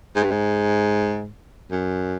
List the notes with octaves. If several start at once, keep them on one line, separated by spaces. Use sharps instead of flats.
G#2
G2
G#2
F#2